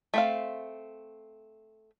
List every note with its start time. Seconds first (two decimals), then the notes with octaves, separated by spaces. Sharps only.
0.14 A3 C4 F5